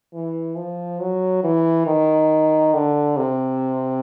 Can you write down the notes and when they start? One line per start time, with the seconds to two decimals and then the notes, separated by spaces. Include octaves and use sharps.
0.13 E3
0.56 F3
1.00 F#3
1.44 E3
1.86 D#3
2.74 D3
3.17 C3